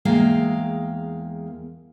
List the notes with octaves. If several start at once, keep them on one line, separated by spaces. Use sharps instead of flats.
E2 G#3 A#3 F5 G5 A#5